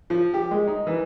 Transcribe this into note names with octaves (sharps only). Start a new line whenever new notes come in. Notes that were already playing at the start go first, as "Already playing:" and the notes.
F3
G4
G#3
D#4
E3